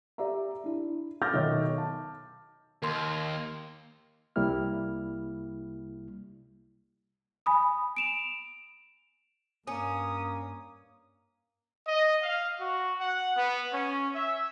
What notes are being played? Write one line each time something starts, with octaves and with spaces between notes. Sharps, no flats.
G4 D5 E5 A#5
D4 E4
D6 E6 F6 G6 A6 A#6
B1 D#3 B3 C#5 E5
A5
D#2 A#4 C6
C2 C3 G3 A#3 E4 F6
G#5 B5 D#6
D7 E7 F7
G2 A#3 C#4 D#6
D#5
F5
F#4
F#5
B3
C#4
E5